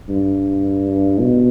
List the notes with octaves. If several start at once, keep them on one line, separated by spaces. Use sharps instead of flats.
G2
B2